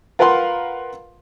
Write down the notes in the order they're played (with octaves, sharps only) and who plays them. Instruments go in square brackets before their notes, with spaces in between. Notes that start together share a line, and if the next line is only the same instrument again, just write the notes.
[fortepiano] F4 A#4 B4 F5 F#5 C6